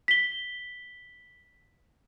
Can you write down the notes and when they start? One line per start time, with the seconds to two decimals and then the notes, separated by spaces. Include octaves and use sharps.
0.08 B6 G7